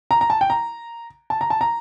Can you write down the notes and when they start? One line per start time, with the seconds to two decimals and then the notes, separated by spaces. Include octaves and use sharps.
0.11 A#5
0.21 A#5
0.30 A5
0.41 G5
0.50 A#5
1.30 A5
1.41 A#5
1.50 A5
1.61 A#5